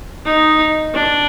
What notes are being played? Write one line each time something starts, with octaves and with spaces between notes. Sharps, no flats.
D#4
D4